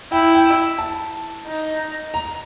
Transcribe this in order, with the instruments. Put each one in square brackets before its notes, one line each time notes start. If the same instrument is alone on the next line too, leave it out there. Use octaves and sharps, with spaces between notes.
[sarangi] E4 [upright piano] G5
[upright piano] G5
A5
[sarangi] D#4
[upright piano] A#5